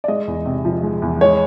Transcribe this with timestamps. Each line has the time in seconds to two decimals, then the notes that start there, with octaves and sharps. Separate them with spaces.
0.04 D5
0.08 G#3 D#5
0.27 E2
0.46 C3
0.65 F3
0.83 G#3
1.02 E2
1.21 G#3 C#5